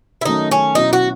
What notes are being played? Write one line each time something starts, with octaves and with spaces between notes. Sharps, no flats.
E4
D#3 F#3 A3 C#4 D#4
C#4
B2 F#3 C#4 D#4 E4
F#4